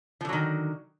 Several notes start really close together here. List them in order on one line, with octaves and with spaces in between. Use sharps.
F3 D3 F#3 D#3